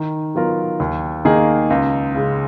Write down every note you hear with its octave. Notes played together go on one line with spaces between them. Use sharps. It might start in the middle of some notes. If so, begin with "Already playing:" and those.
Already playing: D#3
F#3 B3 F4 A#4
D#2
D#3 A#3 D#4 G#4
C#2
C#3 G#3